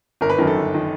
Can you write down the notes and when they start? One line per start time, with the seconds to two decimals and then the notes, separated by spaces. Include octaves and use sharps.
0.21 G1 A#4
0.29 B4
0.38 F#2 D#3 A#4
0.47 A4
0.55 G1
0.74 D#3